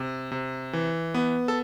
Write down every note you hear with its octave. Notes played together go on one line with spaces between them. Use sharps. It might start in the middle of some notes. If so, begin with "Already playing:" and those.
Already playing: C3
C3
E3
B3
A4